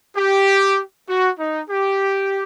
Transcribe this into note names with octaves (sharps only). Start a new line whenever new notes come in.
G4
F#4
D#4
G4